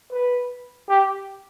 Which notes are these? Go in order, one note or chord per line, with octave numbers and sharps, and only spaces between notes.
B4
G4